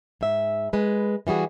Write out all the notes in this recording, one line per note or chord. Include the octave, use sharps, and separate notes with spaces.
G#2 E5
G#3 B4
E3 G3 F#4 G#4